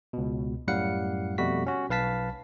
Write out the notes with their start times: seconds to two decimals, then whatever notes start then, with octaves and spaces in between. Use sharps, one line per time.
0.13 C#2 B2
0.67 F#2 A2 G3 F5 F#5 C#7
1.38 F2 B2 G3 A3 F#4 B6
1.66 C#4 F#4
1.90 B1 B4 F5 A5 B6